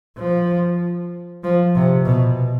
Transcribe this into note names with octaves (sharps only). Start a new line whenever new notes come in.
F3
F3
C3
B2